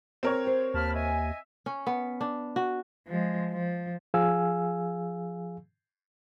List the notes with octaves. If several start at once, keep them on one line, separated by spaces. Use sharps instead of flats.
C4 A#4 C#5
G4 C5
D#2 A5 B5 F6
D#5 E5 G#5
C#4
B3
D4
F#4
F3 G#3
F3
F3 G#4 F5 G#5 E6